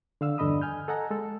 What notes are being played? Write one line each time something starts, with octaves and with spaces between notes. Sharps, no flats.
D3 F5 E6
E2 G2 D3 D#5 B5 D#6
G#5 F6 G6
A4 D#5 F#5 G#5 A#5
G#3 A4